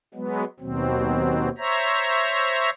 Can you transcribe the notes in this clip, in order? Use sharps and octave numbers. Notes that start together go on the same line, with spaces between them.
F#3 G#3 B3
D#2 B2 F#3 C4
C5 C#5 E5 A#5